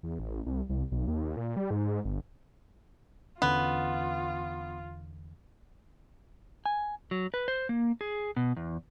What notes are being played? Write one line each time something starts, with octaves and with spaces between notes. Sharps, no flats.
E2
A1
C2
C2
B1
D#2
A#2
G3
G#2
G1
E2 D3 B3 C#4 F4
G#5
F#3
B4
C5
A#3
G#4
B2
E2